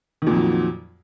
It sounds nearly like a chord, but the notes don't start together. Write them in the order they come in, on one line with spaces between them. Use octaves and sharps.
D#3 A#2 F2 F#3